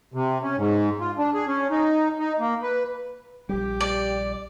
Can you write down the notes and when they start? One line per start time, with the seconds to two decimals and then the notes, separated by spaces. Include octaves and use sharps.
0.14 C3
0.42 C#4
0.58 G#2
1.00 F4
1.18 D4
1.34 G#4
1.47 C#4
1.70 D#4
2.19 D#4
2.40 A#3
2.62 B4
3.49 A#1 G3 G4
3.81 D5